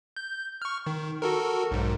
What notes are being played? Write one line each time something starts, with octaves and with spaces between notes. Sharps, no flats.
G6
C#6 F6
D#3
F#4 A4 A#4
B1 G#2